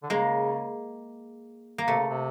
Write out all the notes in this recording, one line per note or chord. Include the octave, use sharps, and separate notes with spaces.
D3
C#3 G#3 A#3
A#3
C3 A3
C#3
C3